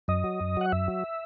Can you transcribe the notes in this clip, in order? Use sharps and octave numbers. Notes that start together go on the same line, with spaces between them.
F#2 D#5
F#3
F#2
F#3 F#5
F#2 E5
F#3